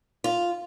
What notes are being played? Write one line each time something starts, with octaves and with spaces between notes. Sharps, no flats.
F4